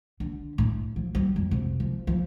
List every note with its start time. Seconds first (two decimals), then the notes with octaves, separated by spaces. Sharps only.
0.20 D3
0.58 A2
0.96 F3
1.15 G3
1.36 F2
1.51 C3
1.80 F3
2.07 F3